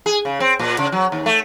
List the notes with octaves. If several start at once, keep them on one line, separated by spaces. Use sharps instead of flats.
G#4
C#3
C4
A#2
C#3
F#3
D#2
A3